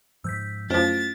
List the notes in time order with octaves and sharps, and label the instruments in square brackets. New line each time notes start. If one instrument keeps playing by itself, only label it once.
[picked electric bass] G#2 F3 [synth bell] E6 G6 B6
[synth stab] F#2 F3 [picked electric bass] A3 [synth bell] C#4 E4 C5 [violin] A6